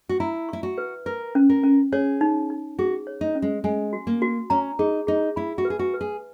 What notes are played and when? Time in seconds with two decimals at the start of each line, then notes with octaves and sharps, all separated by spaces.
0.09 F#4
0.20 E4 A#5
0.49 E4 C#6
0.63 F#4
0.78 B4
1.06 A#4 B4
1.35 C#4
1.50 A#4
1.63 C#4
1.92 G#4 C#5
2.21 D#4
2.50 D#4
2.79 F#4 G#4
3.07 C#5
3.21 D#4
3.35 C#4
3.42 G#3
3.64 G#3 G#5
3.93 F#4
4.07 A#3
4.22 F#4
4.50 C#4 A#5
4.79 D#4 G#4
5.07 D#4 G#4
5.36 E4 B5
5.58 F#4
5.65 B4
5.70 G#4
5.79 F#4
5.94 B4
6.01 G#4